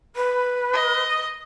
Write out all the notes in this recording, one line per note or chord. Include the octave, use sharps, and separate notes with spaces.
B4
D#5